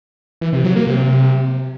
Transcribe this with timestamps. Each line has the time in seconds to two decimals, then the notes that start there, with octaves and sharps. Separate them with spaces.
0.41 E3
0.53 C3
0.64 F#3
0.76 A#3
0.87 C3